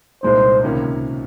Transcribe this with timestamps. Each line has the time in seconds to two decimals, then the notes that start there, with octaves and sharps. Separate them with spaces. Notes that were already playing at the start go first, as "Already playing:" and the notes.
0.23 C2 A#2 G#3 D#4 C5
0.63 C#2 C3 D#3 A#3 C#4